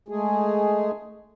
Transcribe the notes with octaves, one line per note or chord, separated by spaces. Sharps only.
G#3 A3 G#4